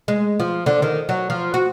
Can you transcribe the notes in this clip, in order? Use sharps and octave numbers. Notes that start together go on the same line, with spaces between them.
G#3
F3
D3
D#3
F#3
F3
F#4